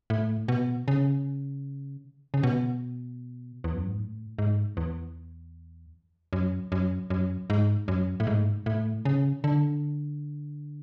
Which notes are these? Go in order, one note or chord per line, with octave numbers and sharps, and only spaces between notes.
A2
B2
C#3
C#3
B2
E2
F#2
G#2
A2
G#2
E2
F#2
F#2
F#2
G#2
F#2
A2
G#2
A2
C#3
D3